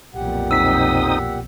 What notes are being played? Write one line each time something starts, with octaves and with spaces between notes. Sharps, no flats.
B1 F2 A#2 G4 F#5
C4 D#4 D#6 E6 B6